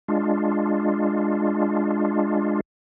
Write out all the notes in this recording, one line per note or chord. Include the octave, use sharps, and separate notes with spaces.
G#3 D4 F4